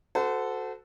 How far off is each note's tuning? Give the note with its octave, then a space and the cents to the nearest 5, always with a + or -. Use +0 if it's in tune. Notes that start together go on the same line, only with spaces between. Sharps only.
F#4 +0 A4 +0 C5 -35